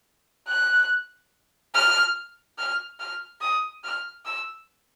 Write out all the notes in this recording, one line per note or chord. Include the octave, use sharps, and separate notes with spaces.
F#6
F6
F6
F6
D#6
F6
E6